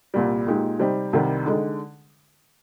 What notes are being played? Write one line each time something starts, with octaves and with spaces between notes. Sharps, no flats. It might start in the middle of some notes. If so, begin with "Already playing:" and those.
C2 A#2 G3
A#2 G#3 D#4 G4
C3 G3 C4 D#4 G4
C2 C3 D#3 G3
D3 G#3 D#4